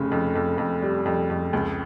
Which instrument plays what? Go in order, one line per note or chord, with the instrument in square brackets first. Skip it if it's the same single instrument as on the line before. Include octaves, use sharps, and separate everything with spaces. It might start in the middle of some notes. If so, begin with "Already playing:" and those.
Already playing: [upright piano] F1 C#3
F2
F2
F2
G3
F2
F2
C#2